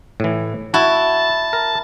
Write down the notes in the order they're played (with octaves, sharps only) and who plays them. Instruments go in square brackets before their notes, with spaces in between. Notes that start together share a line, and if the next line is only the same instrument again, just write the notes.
[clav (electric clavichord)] A2 E3
[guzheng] E4 [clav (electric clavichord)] F#4 [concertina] A5
[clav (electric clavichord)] A#4